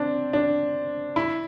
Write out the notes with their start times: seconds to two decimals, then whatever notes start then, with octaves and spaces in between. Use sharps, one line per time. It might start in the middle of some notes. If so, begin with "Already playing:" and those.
Already playing: C4 D4
0.33 D4
1.16 E4